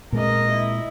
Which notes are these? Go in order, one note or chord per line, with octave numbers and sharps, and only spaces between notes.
A#2 G#3 C4 A#4 D#5
E4